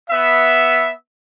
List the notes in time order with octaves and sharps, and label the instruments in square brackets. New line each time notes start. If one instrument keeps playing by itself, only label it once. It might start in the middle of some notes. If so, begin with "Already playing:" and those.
[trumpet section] B3 E5